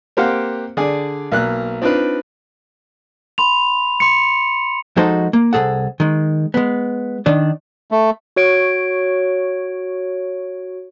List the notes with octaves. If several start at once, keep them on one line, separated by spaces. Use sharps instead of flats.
A#3 C4 G4 C5 F5 F#5
D3 G#4 D5
B1 A#3 F#6
C4 D4 D#4 F4 B4
B5 C6 F7
C6 C#7
F3 G#3 D#4 F#4 A4 C5
A#3
C2 C#3 G#4 A4 F#5
D#3 G#3
G#3 B3
D#3 D4 D5
A3
F#4 C#5 D7